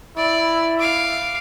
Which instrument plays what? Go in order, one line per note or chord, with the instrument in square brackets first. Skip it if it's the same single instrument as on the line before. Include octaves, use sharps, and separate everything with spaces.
[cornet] E4 [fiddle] D5
[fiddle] F5 D6